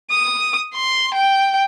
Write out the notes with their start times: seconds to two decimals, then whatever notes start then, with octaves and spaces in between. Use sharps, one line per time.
0.11 D#6
0.74 C6
1.14 G5